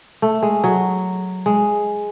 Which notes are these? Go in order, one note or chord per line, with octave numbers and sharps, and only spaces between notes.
A3
G#3
F#3
G#3